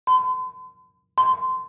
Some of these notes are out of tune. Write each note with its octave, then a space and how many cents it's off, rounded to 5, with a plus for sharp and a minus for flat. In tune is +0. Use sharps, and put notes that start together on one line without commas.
C6 -40
C6 -20